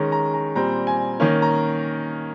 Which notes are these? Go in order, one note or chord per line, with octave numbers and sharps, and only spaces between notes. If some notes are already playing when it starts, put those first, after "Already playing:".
Already playing: D#3 G#3 C#4 A#5
A#5
A#5
A#2 G3 C4 A#5
G#5
D#3 A#3 C#4
A#5